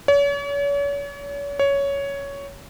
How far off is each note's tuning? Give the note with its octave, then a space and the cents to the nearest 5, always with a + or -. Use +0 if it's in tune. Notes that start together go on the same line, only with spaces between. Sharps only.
C#5 +40
C#5 +10